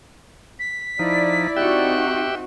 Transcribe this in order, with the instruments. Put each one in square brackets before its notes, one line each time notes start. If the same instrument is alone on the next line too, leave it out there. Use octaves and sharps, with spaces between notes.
[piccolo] B6
[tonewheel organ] F3 D#4 [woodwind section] E4 D5
[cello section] C4 D#4 F#4 [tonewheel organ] G4 E5 G5 [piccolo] F#6